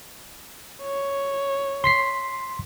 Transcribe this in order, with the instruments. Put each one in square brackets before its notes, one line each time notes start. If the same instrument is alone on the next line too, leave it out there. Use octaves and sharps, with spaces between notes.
[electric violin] C#5
[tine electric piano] C6 B6 C7